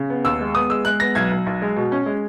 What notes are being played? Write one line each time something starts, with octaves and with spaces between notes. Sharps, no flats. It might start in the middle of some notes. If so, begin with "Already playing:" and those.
Already playing: C#3
B3
D#2 E6
G#3
B3 D#6
G#3 E6
G#3 F#6
B3 A#6
B1 G#6
B1
B1
G#3
B2
C#4
G#3